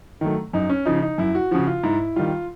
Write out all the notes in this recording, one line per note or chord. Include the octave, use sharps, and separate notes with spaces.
D#3 F#3 A3
F#2 D#4
C#4
C#3 F3 D#4
D#4
F#2 E4
F#4
C#3 F3 F#4
F4
G#2 E4
D#3 G3 F4